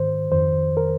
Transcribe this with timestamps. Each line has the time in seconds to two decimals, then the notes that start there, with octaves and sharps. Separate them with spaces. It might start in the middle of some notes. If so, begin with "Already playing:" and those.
Already playing: G#2 D#3 C5
0.32 F2 D#3 C5
0.77 A#4